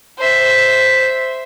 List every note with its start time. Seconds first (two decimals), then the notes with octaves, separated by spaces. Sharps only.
0.19 C5 E5